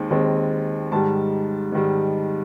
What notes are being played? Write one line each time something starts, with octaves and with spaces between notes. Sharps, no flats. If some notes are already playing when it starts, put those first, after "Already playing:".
Already playing: D#2 D#3 G#3 C4
D#2 D#3 G#3 C4
G#2 D#3 G3 A5
G#2 D#3 G3